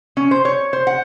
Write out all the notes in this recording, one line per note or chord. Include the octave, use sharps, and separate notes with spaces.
C#4
C5
C#5
C5
F#5